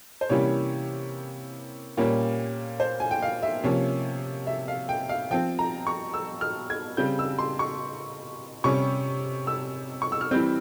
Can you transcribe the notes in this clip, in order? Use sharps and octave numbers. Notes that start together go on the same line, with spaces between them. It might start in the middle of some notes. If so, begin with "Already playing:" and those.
C5
C3 E3 G3 A#3 C#4 C#5
A#2 G3 A#3 C#4
C5
G#5
G5
F5
E5
C3 F3 A#3 C#4 C#5
E5
F5
G5
F5
F3 C4 G5
A#5
C#6
E6
F6
G#6
C#3 G3 C4 G6
E6
C6
C#6
C3 G3 C#4 C#6
E6
C#6
E6
F6
E3 G3 C4 G6